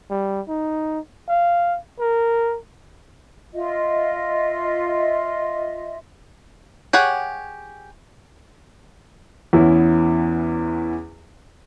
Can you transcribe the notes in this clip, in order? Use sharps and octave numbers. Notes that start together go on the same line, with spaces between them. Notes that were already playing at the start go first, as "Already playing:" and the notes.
G3
D#4
F5
A#4
F4 D#5 E5
G4 G#4 C#5 F#5
E2 E3 B3 C#4 E4